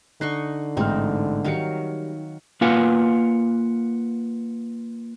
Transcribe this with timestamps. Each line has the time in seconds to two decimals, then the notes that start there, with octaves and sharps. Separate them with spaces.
0.21 D3 D#4 D#5 C#6 F#6 C7
0.77 A1 G#2 C4 D#4 F6
1.45 D#3 F#3 G3 F5 C#7
2.61 A#3 F4 B4 F5 F#5 G#5